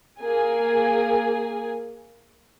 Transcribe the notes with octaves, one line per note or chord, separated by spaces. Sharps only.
A#3 G#4 G#5